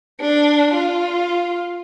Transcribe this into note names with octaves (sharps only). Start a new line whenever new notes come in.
D4
F4